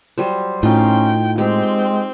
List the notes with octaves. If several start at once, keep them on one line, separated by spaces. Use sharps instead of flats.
F#3 G3 C5
A2 C#4 D#4 F4 G5 C6
G#3 C4 G4 G5